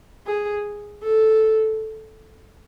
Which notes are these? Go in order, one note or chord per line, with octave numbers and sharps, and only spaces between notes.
G#4
A4